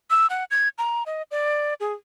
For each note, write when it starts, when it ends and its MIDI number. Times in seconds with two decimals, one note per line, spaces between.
0.10 0.27 88
0.30 0.44 78
0.51 0.68 92
0.78 1.03 82
1.06 1.22 75
1.31 1.74 74
1.80 1.93 68